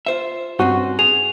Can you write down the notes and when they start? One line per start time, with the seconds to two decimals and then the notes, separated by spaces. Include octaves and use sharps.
0.06 F4 C5 E5
0.59 G2 C4 C#4 D#4 F#4
0.99 G#4 F7